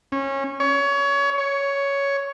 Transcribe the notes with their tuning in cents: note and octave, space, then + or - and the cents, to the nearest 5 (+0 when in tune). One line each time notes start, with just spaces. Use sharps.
C#4 -20
C#5 +25
C#5 +10